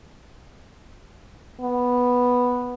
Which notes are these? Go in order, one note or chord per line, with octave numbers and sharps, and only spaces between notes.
B3